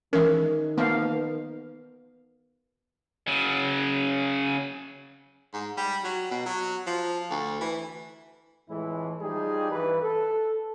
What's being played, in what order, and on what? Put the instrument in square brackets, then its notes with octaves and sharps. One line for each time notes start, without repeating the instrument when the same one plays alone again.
[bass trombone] D#3 [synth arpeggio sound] E3 G#3 C#4 [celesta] A#4
[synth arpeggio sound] F3 A#3 [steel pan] B3 F5
[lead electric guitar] C#3 F#3
[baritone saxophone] G#2
G3
F#3
B2
F#3
F3
D2
E3
[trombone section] F2 A2 E3 G#3 E4
F3 G3 D#4 G4 G#4
G2 E3 B4
A4